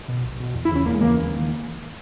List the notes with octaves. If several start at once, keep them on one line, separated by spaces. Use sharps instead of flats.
B2
B1
B2
E2
E4
C#3 E3 C#4
E2 A#3
G#3
C#3 E3 A#3
D#2
D#3